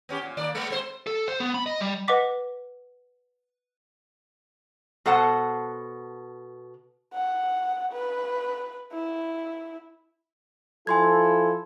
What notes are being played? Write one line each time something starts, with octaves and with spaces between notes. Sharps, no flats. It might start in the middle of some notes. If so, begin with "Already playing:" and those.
B3 C#4 G4
A#2
D#3 A#3 D5
G#3 A#3 B3
G#3 C4 C5
A4
C5
B3
B5
D#5
G3
B4 D#5 F#5 D6 B6
B2 A4 C5 F#5 A5
F#5
B4
E4
F3 E4 A4 G#5 C6 G#6